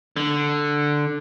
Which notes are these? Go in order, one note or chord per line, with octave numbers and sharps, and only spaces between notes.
D3